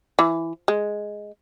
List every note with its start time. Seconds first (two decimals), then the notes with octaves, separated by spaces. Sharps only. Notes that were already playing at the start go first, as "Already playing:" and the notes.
0.19 E3
0.68 G#3